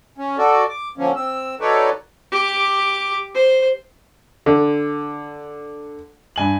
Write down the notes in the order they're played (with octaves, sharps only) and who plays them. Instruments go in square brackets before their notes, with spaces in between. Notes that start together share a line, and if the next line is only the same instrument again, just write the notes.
[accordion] C#4
F#4 A4 D5
D6
D3 F3 A#3 C#4
C4 E6
F#3 D#4 A4 B4 C#5 D5
[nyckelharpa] G4 D6
C5
[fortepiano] D3
[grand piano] G2 G#5 F#7